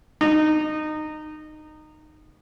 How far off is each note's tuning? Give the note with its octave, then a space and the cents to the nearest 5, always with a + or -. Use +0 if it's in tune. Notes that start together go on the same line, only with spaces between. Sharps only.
D#4 -20